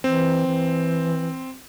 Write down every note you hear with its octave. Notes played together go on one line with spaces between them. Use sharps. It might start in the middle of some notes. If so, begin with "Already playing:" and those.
E3 C4
E3